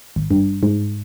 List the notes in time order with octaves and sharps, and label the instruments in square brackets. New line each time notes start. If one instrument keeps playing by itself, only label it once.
[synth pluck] G#1
G2
G#2